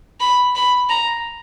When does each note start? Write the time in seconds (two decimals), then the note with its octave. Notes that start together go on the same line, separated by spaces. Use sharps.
0.20 B5
0.55 B5
0.90 A#5